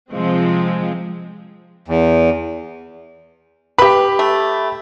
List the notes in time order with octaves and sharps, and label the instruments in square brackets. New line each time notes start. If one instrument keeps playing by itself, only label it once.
[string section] C3 F3 G#3 C4
[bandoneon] E2
[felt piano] G4 B5 [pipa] B4
[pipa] A3